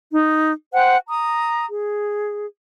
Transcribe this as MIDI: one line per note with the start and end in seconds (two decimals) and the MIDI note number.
0.11 0.51 63
0.73 0.96 72
0.73 0.96 78
0.73 0.96 79
0.73 0.96 90
1.08 1.65 82
1.08 1.65 87
1.67 2.46 68